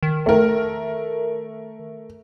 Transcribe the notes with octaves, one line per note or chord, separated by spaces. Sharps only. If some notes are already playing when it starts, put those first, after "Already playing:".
D#3
A3 A#4